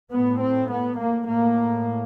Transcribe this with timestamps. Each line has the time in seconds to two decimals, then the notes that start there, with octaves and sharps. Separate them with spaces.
0.11 A2 B3
0.40 C4
0.70 B3
0.99 A#3
1.28 A2 A#3